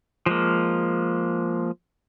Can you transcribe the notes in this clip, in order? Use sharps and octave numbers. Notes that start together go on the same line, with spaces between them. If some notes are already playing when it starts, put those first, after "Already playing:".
F3 G#3 A#3